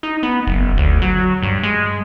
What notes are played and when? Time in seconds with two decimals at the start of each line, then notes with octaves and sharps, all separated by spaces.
0.03 D#4
0.23 B3
0.47 F#1
0.78 D2
1.02 F#3
1.42 G2
1.63 G#3